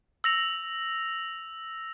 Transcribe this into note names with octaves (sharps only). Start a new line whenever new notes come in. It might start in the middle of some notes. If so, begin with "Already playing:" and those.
E6 A#6 F7